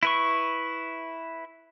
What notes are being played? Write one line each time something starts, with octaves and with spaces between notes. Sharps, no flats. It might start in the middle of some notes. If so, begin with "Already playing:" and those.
E4 B4 C#6